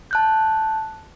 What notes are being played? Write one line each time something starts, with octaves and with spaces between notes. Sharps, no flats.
A5 F#6 G6